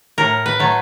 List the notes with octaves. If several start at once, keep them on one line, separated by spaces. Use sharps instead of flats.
A2 A#4
B4
F#3 A3